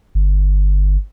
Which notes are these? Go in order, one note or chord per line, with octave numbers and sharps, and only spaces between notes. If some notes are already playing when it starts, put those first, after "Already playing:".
G1